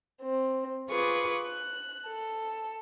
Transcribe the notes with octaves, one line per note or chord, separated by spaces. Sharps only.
C4
F4 G#4 B4 C#6 D6
F#6
A4